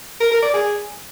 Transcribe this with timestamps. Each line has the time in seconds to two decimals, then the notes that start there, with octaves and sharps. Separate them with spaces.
0.20 A#4
0.31 A#4
0.43 D5
0.54 G#4